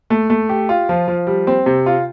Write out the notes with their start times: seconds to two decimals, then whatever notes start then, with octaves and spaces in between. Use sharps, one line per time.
0.10 A3
0.30 A3
0.49 G4
0.69 F4
0.89 F3
1.08 F3
1.27 G3
1.47 C4
1.66 C3
1.86 F4